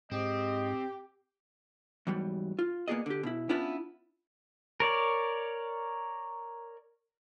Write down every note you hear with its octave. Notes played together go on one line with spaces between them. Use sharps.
G#2 C4 G4 D#5
E2 G#2 F#3 G3
F4
A#3 B3 E4 G#4 D5 D#5
D3 G4
B2 E4
B3 C#4 D4 E4 F4 B4
A#4 C#5 D5